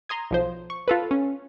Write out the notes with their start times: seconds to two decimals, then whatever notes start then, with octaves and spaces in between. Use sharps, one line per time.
0.09 A#5 C6 D#6 G#6
0.31 B1 F3 C5
0.70 C#6
0.88 F4 A4 B4
1.11 C#4